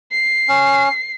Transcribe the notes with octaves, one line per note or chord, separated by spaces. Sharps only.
C7
C#4